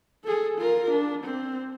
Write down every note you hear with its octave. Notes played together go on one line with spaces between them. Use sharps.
G#4 A4
F4 A#4
D4
C4